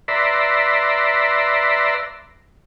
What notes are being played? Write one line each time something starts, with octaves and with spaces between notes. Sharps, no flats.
B4 D5 E5 A#5 C6